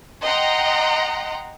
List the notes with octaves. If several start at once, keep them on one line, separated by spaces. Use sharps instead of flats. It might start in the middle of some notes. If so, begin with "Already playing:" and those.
D#5 F#5 G5 A#5 C6